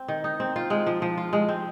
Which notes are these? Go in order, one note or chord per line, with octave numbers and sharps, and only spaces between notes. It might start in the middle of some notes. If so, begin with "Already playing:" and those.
Already playing: C4
D#3
D#4
C4
F4
G#3
F3
F3
F4
G#3
C4